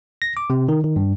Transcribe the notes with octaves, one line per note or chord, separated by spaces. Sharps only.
A#6
D6
C3
D#3
D#3
G2